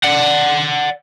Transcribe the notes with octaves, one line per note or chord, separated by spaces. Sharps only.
D5 F#5